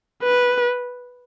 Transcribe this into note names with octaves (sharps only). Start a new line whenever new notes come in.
B4